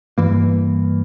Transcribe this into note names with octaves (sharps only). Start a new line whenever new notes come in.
G2 E3 A#3